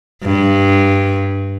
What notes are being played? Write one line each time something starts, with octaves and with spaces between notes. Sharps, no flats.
G2